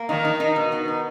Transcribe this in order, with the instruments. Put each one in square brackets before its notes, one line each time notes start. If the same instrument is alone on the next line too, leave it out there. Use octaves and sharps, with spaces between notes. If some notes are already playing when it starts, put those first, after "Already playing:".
Already playing: [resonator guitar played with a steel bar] A#3
[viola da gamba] D#3 [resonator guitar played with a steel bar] D#4
[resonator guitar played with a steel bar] D#4
D#4
B2
B3
D#4